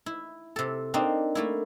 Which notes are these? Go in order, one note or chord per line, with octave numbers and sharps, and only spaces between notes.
E4
C3 A4
A#3 C4 D4 D#4
A3 A#3 E4